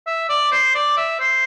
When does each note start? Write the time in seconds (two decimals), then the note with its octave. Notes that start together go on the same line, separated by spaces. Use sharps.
0.07 E5
0.30 D5
0.52 C5
0.75 D5
0.97 E5
1.20 C5